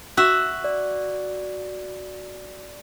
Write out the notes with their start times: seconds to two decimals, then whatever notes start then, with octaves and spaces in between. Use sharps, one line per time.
0.17 F#4 E5
0.64 D5